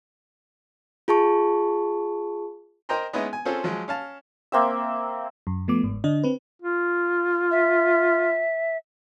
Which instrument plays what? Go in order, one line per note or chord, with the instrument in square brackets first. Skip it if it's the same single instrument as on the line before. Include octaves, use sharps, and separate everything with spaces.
[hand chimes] F4 G#4 A5 C#6
[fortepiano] A#4 C5 D#5 G5 A#5 C6
G#3 B3 C#4 D#4 E4
G#5
C4 C#4 F4 G#4 A4 C5
F3 F#3 G#3
C#4 F5 A5
[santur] A#3 C4 E5
[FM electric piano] F#2
F3 A3 B3 D6
G1 G#2
D3 D4 D#5
C4 B4
[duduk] F4
[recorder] E5